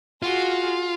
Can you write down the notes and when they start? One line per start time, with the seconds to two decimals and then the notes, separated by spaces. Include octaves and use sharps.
0.23 F4 F#4 G#4